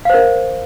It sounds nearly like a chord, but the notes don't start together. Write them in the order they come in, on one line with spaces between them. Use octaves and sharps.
F5 C5 A#4